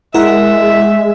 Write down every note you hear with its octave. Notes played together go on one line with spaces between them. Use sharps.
G#3 E4 A#4 E5 F#5